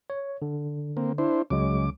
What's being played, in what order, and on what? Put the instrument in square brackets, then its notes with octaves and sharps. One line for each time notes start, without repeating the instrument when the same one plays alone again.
[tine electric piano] C#5
D3
[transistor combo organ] A#3 C4
D4 E4 C5
[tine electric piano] C#2 F#3 G#3 [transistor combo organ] C#3 D6